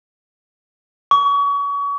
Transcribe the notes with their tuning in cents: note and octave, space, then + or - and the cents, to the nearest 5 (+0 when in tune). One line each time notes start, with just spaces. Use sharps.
C#6 +35